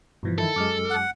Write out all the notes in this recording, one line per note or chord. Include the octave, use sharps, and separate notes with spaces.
G2 B2 E3 F3
D#3 E4 A4
F#2 G#3 D6 F6
F#5